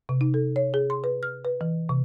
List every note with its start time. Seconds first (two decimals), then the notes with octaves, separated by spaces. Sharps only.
0.09 C3
0.21 D#4
0.34 A4
0.56 C#5
0.74 G#4
0.90 C6
1.04 B4
1.23 F6
1.45 B4
1.61 E3
1.89 C3